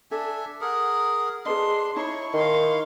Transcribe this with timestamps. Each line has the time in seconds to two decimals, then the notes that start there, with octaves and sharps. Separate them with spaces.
0.11 D4 A4 E5 G#5
0.61 G#4 A#4 F#5
1.46 D4 G#4 B4 D#5 C6
1.96 D#4 E4 C#5 A5 B5 C#6
2.34 D#3 F5 C6